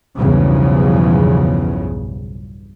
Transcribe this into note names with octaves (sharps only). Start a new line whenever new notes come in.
B1 E2 G2 C#3 F3